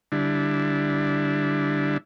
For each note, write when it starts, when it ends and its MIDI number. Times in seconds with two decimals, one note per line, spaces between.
0.12 1.97 50
0.12 1.97 55
0.12 1.97 62
0.12 1.97 64